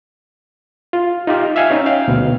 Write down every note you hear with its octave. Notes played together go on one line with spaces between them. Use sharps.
F4
D#4 F4 G4 F6
E5 F5 G5 G#5
C#4 D#4 C#5
F5 G5
D2 B2